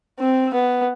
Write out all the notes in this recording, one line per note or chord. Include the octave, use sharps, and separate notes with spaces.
C4
B3